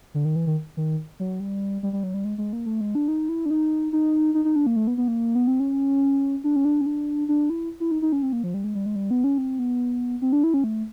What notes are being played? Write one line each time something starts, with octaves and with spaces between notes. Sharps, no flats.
D3
D#3
E3
D#3
D#3
F#3
G3
G3
G3
F#3
G3
G#3
G#3
A#3
A3
G#3
D4
D#4
E4
D4
D#4
D#4
D#4
D#4
D4
A#3
A3
B3
B3
A#3
B3
C4
C#4
D4
C#4
D4
C#4
D4
D4
E4
E4
D#4
D#4
C#4
C4
A#3
F3
G3
G#3
G3
G#3
G3
B3
C#4
C4
B3
C4
D4
E4
C#4
A3